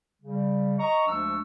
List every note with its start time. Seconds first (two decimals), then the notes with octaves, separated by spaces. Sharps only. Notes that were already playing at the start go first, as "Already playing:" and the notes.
0.22 C#3 G3
0.78 D#5 A#5 C#6
1.06 D2 F3 G#3 D4 C#6 E6